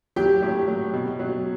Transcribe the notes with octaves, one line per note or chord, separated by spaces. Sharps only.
F#3 G4 G5
A2
F#3
B2
F#3